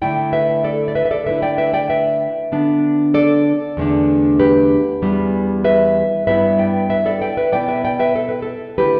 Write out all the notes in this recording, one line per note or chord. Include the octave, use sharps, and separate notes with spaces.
D3 A3 E4 D5 G5
B4 E5
A4 D5
D5
B4 E5
E5
A4 D5
D3 A3 E4 B4 E5
D5 G5
B4 E5
D5 G5
B4 E5
D3 B3 D4
A4 D5
E2 D3 A3 D4
G4 B4
E2 E3 G3 B3
B4 E5
G2 G3 B3 E4 B4 E5
D5 G5
B4 E5
A4 D5
D5 G5
B4 E5
B2 B3 E4 D5 G5
B4 E5
D5 G5
B4 E5
A4
B4
A4
D3 A3 E4 G4 B4